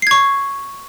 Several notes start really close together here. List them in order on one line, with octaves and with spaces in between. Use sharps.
C7 G#6 C#6